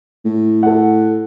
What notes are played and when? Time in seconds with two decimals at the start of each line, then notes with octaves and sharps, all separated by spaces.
0.25 A2
0.63 A4 F#5